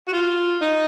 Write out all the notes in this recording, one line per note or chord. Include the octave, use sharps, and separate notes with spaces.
F#4
F4
D#4